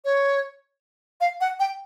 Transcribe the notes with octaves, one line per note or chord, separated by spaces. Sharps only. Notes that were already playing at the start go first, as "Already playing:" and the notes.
C#5
F5
F#5
G5